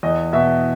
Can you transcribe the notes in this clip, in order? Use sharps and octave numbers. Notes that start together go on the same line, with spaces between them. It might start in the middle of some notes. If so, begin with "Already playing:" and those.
E2 D#5
B2 E5